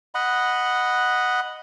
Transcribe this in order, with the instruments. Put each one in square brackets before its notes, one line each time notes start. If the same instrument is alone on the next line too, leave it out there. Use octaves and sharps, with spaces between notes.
[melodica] D#5 F#5 B5